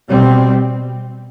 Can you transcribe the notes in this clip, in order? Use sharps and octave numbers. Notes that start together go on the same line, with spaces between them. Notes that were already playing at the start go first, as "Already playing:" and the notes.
B2 G3 C4